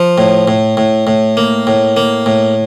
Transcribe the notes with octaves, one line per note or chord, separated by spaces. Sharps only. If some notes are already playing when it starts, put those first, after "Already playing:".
Already playing: F3
A2
A2
A2
A2
A#3
A2
A#3
A2